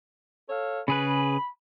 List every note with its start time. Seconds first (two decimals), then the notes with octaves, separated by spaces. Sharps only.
0.49 A4 C#5 F5
0.88 C#3 G#4 B4 B5